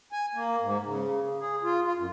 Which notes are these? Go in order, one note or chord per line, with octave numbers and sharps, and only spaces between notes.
G#5
A#3
G#2
C#3
G#4
F4
F4
F#2